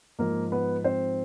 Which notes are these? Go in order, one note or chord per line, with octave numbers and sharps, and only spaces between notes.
G#2 F3 A#3 A#4
B3 B4
C4 C5